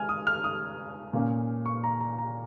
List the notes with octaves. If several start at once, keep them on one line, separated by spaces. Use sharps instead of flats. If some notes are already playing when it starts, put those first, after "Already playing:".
Already playing: G#3 G#5 F6
D#6
F6
D#6
A#2 A#3 C#4
C#6
A#5
A#5
A#5